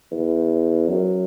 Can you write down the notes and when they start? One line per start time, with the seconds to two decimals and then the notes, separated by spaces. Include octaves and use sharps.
0.11 E2
0.88 F#2